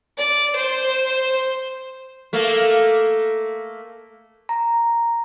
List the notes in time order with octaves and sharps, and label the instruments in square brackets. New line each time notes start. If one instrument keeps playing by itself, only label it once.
[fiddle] D5
C5
[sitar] A3 A#3
[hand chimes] A#5